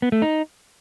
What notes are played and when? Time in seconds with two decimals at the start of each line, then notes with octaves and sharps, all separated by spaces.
0.02 B3
0.12 A3
0.22 D#4